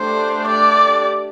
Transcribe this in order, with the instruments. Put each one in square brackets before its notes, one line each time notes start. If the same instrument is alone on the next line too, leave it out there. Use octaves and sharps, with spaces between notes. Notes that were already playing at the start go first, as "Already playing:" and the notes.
Already playing: [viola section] A3 D4 G4 [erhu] C5
[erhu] D5